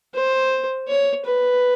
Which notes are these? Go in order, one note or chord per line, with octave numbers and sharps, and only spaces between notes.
C5
C#5
B4